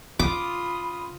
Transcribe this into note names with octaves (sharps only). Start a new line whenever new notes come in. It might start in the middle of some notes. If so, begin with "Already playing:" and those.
C#3 F4 B5 D6 D#6